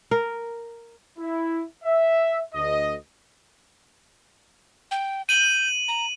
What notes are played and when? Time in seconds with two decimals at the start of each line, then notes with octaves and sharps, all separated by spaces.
0.11 A#4
1.18 E4
1.84 E5
2.54 D2 D#5
4.91 G5
5.29 G6 D#7 F#7
5.88 A#5